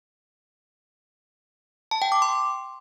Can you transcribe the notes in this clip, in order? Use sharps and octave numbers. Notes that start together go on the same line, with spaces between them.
A5
G5
D6
C6